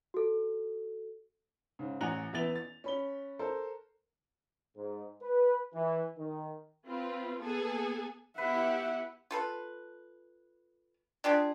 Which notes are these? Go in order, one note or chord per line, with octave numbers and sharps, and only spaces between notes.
F#4 A4
G#2 C#3
A1 F#5 G#5 A#5 F#6 F7
E2 B3 E4 B4 A6 F7
A6
C#4 B5 G7
A4 A#4 C5
G#2
B4
E3
D#3
C4 F4 B4
A#3 B3 G#4 A4 G#5
B3 E4 G4 B4 E5 F#5
F4 A4 B4
D4 F4 G4 G#4